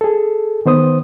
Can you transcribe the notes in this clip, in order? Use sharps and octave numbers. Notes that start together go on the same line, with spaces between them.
G#4 A4
D#3 B3 C5 D#6